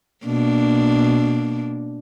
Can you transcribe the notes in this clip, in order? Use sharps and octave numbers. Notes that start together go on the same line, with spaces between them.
B2 A#3 D4